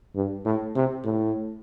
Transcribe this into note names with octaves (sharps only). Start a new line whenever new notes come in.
G2
A2
C3
A2